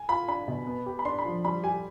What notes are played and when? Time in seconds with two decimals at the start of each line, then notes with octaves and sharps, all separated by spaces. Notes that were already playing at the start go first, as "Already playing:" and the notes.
Already playing: G#5
0.09 F4 B5
0.28 D4 B5
0.48 B2
0.67 B3
0.86 G4
0.99 B5
1.05 D4 C6
1.19 B5
1.25 F3
1.45 G3 B5
1.63 G4 G#5